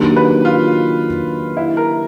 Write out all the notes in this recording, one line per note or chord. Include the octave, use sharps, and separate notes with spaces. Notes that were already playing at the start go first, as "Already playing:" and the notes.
Already playing: D#3 F#3 A#3 D4 G4
B4
F4
E4
A#4